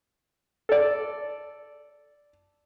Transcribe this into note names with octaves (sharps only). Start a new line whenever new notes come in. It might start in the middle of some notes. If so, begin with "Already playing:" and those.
A4 D5